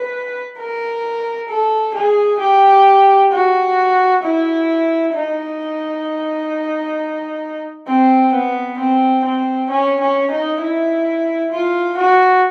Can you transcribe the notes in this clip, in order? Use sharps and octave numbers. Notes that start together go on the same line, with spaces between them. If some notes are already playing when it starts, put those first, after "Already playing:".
Already playing: B4
A#4
A4
G#4
G4
F#4
E4
D#4
C4
B3
C4
C4
C#4
C#4
D#4
E4
F4
F#4